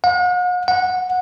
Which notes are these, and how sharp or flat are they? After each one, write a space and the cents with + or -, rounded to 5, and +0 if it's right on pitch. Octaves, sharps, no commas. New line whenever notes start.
F#5 -45
F#5 -15